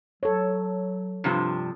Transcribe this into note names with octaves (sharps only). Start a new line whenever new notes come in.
F#3 A4 C#5
G2 C3 F3